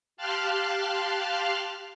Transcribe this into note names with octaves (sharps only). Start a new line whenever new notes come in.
G4 F5 A5 C6 F6 F#6